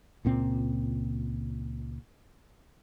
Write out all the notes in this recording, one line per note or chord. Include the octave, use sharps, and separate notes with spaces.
C#2 A#2 C4